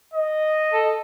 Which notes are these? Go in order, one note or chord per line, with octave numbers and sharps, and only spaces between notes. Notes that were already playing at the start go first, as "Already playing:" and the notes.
D#5
A4